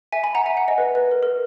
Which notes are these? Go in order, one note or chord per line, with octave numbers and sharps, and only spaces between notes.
E5 G#5
G#5 B5
F#5 A#5
E5 G#5
F#5
D#5
B4
B4
A#4
A#4